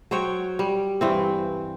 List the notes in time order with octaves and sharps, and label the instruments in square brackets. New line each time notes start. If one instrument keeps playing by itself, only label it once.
[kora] F#3 C5 C#5 G5
G3
G2 E3 C4